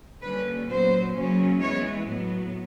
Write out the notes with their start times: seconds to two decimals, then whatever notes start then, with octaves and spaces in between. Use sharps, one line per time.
0.22 D3 G3 A#3 C#4 B4
0.68 A#2 F#3 B3 C5
1.13 C#3 F#3 A#3 C#4
1.60 E3 G#3 B3 C#5
2.06 A2 F#3 B3